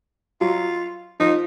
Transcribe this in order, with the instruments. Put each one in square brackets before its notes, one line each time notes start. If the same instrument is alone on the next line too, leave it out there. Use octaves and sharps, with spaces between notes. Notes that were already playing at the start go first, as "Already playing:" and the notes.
[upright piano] F#3 [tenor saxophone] F4
[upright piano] F3 [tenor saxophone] D#4